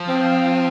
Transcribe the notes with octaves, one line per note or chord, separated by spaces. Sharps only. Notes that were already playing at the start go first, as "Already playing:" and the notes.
Already playing: F3
C4